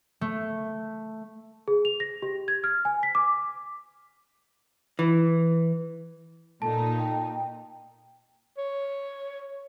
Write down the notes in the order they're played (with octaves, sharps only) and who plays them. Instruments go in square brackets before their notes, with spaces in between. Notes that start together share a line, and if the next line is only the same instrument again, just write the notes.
[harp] A3
[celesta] G#4
F7
A#6
G4
G#6
F6
G#5
B6
D6
[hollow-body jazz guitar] E3
[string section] A#2 D#4 [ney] A4 [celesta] A5
[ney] G5
[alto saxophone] C#5